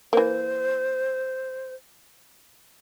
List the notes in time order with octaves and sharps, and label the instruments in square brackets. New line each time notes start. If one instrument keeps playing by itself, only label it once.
[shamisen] E3 A#3 [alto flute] C5